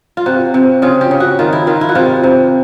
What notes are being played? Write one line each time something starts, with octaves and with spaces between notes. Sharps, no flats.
F4
C3 F#4
C3
C#3 F4
G4
C#3
F#4
D#3 F4
E4
D#3 F4
E4
F#4
C3 F4
C3